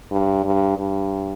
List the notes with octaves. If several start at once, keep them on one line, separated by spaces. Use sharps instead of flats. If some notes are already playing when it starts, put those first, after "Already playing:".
G2
G2
G2